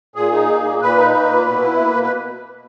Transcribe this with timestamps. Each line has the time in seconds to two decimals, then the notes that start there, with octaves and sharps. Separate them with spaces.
0.16 A#2 G#4
0.32 D#4
0.48 A#3
0.64 A#2
0.81 A#2 B4
0.98 D#4
1.14 A#3
1.30 A#2
1.46 B2
1.62 E4
1.79 A#3
1.96 B2
2.03 B4